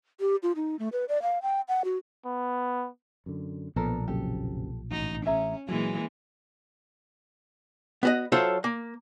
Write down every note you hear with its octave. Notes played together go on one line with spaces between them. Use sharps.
G4
F4
D#4
A3
B4
D5
F5
G5
F#5
F#4
B3
F#2 D3
B1 A#2 F3 B3 D4 A4 A#4
F#1 F#2 C3 G4 A4
A1 D#4 F#4
C#4 G#4 E5 A#5
A#2 E3 F#3 G#3 A#3 G#4
B3 F#4 D#5
F#3 F4 A4 C5 C#5 E5
A#3